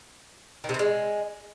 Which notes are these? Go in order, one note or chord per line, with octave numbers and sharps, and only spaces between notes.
D#3
C3
E3
G#3